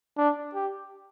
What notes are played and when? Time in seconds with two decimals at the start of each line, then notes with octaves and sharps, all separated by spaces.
0.18 D4
0.55 G4